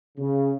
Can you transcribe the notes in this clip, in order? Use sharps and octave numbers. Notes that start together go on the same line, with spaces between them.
C#3